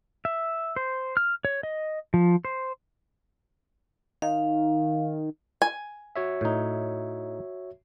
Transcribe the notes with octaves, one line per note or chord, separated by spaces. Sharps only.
E5
C5
F6
C#5
D#5
F3
C5
D#3 F5
G#5
F#4 C#5 E5
A2 D#4